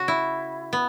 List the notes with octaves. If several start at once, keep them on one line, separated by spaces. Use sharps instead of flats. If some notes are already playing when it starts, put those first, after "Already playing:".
Already playing: C#3 F#4
E4
B3